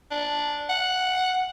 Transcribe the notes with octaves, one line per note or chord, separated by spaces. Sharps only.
D4
F#5